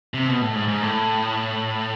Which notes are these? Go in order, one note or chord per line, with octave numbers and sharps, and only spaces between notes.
C3
B2
A2
G#2
G#2
A2